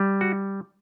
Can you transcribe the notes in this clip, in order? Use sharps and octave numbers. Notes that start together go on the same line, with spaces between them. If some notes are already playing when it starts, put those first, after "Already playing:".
Already playing: G3
F#4